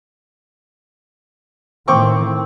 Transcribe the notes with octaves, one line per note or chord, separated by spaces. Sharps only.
A2 D#3 C4 G5 C#6 D6